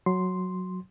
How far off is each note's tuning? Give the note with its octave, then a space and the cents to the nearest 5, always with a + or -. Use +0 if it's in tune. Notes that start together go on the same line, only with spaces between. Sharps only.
F#3 -5 C6 +0